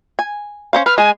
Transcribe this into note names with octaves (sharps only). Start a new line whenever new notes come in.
G#5
C#4 C5 F5
B4 F6
G#3 G#5